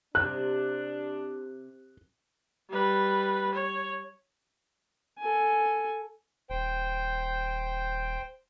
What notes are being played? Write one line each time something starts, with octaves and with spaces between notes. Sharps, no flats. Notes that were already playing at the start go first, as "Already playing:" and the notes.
C3 D4 F#6
G3 B4
C#5
A4 G#5
D#1 C5 G5